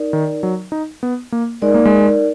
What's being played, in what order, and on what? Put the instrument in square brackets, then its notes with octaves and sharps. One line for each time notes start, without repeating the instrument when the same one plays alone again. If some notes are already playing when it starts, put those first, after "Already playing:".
Already playing: [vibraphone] D#4 A#4 D5
[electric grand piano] D#3
F#3
D#4
B3
A#3
[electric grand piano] G#3 [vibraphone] D#4 A#4 D5
[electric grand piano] A#3
G#3